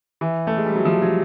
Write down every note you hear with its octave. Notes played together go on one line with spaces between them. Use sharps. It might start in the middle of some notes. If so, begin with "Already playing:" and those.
E3
A3
G#3
G3
F#3
F3
F#3